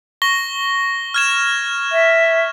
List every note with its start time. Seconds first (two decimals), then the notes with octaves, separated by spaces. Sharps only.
0.22 C#6 A#6 G7
1.14 F6 G#6 E7
1.92 E5